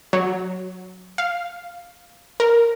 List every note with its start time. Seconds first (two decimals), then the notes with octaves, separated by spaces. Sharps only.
0.13 F#3
1.18 F5
2.40 A#4